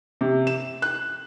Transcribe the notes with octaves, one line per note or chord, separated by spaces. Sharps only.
C3
E7
F#6